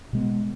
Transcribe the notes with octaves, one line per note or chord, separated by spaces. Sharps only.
B2 G#3 B3